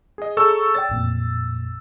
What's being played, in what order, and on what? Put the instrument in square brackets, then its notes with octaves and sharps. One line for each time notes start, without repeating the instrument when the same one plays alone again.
[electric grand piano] G#4 D#5
[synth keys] G#4 C#5 A#5 [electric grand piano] A4 C#6 E6
[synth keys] C#5 D5 G5 [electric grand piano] A6
[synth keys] A1 F2 A#2